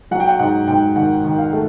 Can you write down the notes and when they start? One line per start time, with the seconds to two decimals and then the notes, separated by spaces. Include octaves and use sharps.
0.11 F#3 F#5
0.20 G5
0.29 F#5
0.39 G#2 F#5
0.68 G#2 G5
0.96 D#3 F#5
1.24 D#3
1.38 F5
1.53 A3